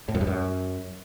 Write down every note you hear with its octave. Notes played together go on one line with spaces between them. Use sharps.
A2
F#2
G2
F#2